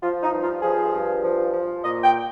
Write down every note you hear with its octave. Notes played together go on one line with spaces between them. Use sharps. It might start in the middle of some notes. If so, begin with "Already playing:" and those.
F3 F4
D#4
G2
F4
F3 G#4
G2
F3
F3
A#2 D#5
G5